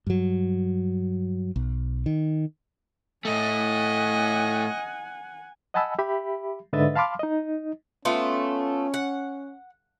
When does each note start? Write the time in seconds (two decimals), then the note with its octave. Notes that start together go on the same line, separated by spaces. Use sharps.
0.07 G2 F#3
1.56 B1
2.06 D#3
3.25 A2 A3 D#5 F#5 G#5
5.74 D#5 F#5 G#5 A5 B5 E6
5.99 G4 E5 B5
6.73 G#2 D3 B4 D#5 E5 A6
6.96 F5 A5 B5 C6 D6 F6
7.19 D#4 D#5
8.05 A3 B3 C#4 F4
8.94 F#5